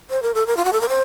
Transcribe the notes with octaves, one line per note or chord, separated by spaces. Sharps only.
C5
A#4
A4
A#4
F4
F#4
A4
A#4
C5